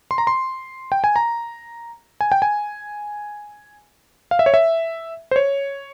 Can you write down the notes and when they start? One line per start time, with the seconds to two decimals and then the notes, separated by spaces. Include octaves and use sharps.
0.11 C6
0.18 A#5
0.27 C6
0.92 G5
1.04 G#5
1.16 A#5
2.21 G#5
2.32 G5
2.42 G#5
4.31 F5
4.39 E5
4.46 C#5
4.54 E5
5.31 C5
5.36 C#5